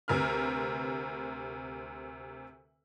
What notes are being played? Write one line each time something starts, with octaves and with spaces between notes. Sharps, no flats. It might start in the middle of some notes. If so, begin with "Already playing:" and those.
D2 C3 A#4 B4 F6